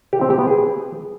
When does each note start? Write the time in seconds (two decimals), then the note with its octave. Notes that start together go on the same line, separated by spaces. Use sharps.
0.13 G4
0.21 C4
0.30 G4
0.39 B3
0.47 G#4